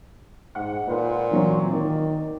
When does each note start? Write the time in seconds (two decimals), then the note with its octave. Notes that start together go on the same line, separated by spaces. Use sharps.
0.55 G#2 F#5
0.88 A#2 B4 C5 F#5
1.31 E3 F#3 C4
1.70 D#3 D5